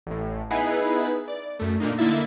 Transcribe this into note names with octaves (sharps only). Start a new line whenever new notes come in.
A1 A2
B3 D#4 E4 G#4 B4
D5
F#2 A3
A#2 D3 A#3 D#4
D3 A#3 D#4 E4 E5 A6